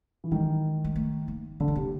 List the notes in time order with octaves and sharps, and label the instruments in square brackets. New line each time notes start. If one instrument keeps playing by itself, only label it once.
[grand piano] E3
[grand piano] D#3 [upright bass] G#3
[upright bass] G#3
A3
A#3
[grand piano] D3 [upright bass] A#3
[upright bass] A3
[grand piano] C3 [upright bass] A#3